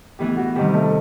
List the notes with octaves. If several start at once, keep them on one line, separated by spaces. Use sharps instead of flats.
A2 E3 B3 E4 G4
F#4
C3 D#3 G3 G4
A3 A4